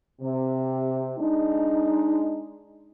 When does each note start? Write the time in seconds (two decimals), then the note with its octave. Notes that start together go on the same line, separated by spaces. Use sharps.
0.22 C3
1.19 G#3 D4 D#4